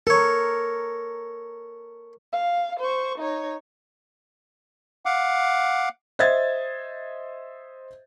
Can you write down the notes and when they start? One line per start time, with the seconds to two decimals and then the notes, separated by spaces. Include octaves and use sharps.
0.07 A4 A#4 C#5
2.33 F5
2.80 C5 C#6
3.18 D#4 C#5
5.06 F5 F#5 D6
6.19 C5 D#5 E5 G#6 A6